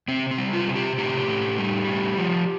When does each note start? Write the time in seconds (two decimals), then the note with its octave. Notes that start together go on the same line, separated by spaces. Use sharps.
0.08 C3 C4
0.31 C4
0.38 G3
0.53 F4
0.68 C3
0.76 G4
0.98 A2 G4
1.28 A2
1.58 G3
1.87 A2
2.17 F3